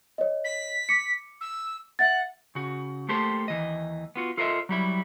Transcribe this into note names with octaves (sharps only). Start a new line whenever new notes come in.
C#5 D#5
B6
D6 C#7
E6
E5 F#5 A6
C#3 F#4
A3 A#3 G4 A4 C5
D#2 E3 D#5
B3 F4 F#4
F4 A4 A#4 C5 D#5 E5
F#3 G3 E4